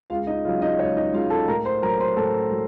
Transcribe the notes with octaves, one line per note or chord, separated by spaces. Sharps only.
C#2 F4 F5
D#4 D#5
C#3 F#3 F4 F5
D#4 D#5
C#2 C#5
D#4 D#5
C#3 F#3 F4 F5
A4 A5
A2 A#4 A#5
C5 C6
F#3 A#4 A#5
C5 C6
A2 A4 A5
F#3